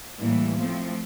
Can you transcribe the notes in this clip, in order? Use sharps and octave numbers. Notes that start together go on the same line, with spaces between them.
A2 E3 G3 A#3
F3 A3 C4